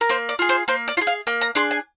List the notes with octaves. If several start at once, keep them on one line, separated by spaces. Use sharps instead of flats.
A#4
A#3 C5
D5
F4 G#4
C5
A#3 C5
D5
F4
G#4
F5
A#3
A#5
D4 G#4 C6
G#5